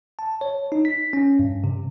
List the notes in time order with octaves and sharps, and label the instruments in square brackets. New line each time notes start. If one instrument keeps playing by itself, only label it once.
[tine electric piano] A5
C#5
D#4
B6
C#4
G2
C3